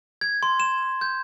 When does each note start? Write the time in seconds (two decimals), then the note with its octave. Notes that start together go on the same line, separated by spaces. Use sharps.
0.21 G#6
0.43 C6
0.60 E7
1.01 G6